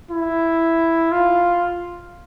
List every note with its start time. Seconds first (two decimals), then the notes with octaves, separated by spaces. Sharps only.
0.11 E4
1.11 F4